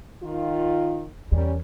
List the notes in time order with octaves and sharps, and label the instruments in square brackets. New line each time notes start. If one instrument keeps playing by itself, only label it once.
[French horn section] D#3 F4
[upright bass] E2 [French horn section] G3 C#4 A#4